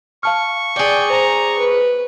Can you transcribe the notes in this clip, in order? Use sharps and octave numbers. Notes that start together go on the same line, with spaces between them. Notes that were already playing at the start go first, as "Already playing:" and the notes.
F5 A5 C#6 F6
G#4 D5 G5
C5 A#5
B4